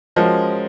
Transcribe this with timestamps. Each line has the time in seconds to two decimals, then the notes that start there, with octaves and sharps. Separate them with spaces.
0.16 F3 G#3 C#4 F#4 A#4 D#5